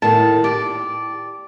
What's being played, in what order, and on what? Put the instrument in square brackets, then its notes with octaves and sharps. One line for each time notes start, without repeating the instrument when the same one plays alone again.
[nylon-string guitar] A2 D#3 A3 [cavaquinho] A5
[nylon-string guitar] G4 [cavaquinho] D5